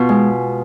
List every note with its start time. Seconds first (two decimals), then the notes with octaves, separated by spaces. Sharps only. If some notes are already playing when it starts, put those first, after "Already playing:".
Already playing: B2 F4
0.09 G#3